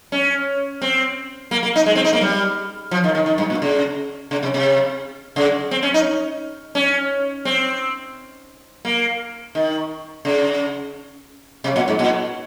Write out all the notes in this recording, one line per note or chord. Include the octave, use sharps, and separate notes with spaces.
C#4
C4
A#3
A#3
D#4
G#3
C4
D#4
A#3
G3
F3
D#3
D#3
D#3
G2
A#2
C#3
C#3
C3
C3
C#3
C4
C#4
D#4
C#4
C4
A#3
D#3
C#3
C3
A#2
G#2
A#2